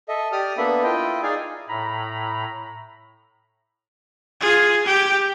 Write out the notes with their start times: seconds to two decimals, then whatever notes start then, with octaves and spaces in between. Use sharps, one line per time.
0.09 A4 D#5 E5
0.32 G4 D5 D#6 F6
0.58 A#3 B3 D4 A4 E5 B5
0.83 E4 F4 D#5 G5
1.23 D#4 G#4 D5 F5 G#5
1.68 A2 A#5 B5
4.41 F4 G#4
4.86 G4 G5